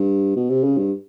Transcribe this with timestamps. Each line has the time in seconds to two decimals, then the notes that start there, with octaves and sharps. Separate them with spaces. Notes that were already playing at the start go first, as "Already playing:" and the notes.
Already playing: G2
0.36 B2
0.50 C3
0.64 C#3
0.78 G2